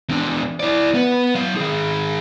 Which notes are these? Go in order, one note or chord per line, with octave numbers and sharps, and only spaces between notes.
E2 D4
E4 D5
B3
F#3 F5
D#3 G#4